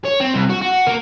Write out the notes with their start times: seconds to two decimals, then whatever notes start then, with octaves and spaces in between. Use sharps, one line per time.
0.05 C#5
0.20 C4
0.34 C2
0.50 F#4
0.61 F#4
0.87 A#3